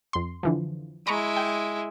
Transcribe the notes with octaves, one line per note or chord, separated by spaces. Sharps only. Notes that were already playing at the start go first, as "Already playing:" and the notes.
F2 C6
D3 E3 F3
G#3 E4 A#5 B5 C#6
G5